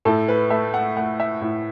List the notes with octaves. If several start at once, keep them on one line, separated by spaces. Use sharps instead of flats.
A2 A4
B4
A3 E5
F#5
A3 F#5
E5
A2